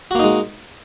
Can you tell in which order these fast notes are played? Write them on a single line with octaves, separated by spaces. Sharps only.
F#4 A#3 D#4 G#3